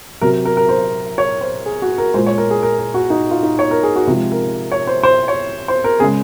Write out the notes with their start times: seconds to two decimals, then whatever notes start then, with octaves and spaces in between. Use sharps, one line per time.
0.21 C3 F#3 A#4
0.45 A#4
0.57 A#4
0.69 C5
1.18 C#5
1.41 C5
1.66 G#4
1.82 F#4
1.98 A#4
2.14 A#2 G#3 C5
2.26 C#5
2.38 A#4
2.51 G#4
2.63 A#4
2.78 A#4
2.94 F#4
3.10 D#4
3.31 F4
3.43 D#4
3.59 C#5
3.71 A#4
3.83 G#4
3.96 F#4
4.07 C3 F3 G#3
4.32 A#4
4.72 C#5
4.87 C5
5.03 C5
5.28 C#5
5.68 C5
5.84 A#4
6.00 C#3 G#3 G#4